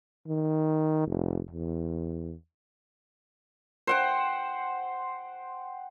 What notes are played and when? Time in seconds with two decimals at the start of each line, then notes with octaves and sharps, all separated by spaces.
0.27 D#3
1.07 F1
1.51 E2
3.87 C5 F#5 G5